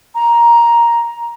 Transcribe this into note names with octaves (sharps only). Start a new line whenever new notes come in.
A#5